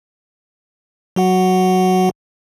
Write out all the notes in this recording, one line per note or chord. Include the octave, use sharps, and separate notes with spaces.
F#3 F#4 F#5